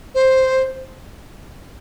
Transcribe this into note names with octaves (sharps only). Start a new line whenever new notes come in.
C5